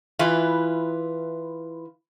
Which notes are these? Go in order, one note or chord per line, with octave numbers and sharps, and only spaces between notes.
E3 E4 F4 B4